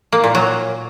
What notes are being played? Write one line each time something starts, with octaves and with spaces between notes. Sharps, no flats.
A#3
A#2
F#3